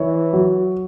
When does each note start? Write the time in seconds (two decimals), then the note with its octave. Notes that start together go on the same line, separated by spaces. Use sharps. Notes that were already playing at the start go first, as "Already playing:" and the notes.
Already playing: E3 C#5
0.33 F#3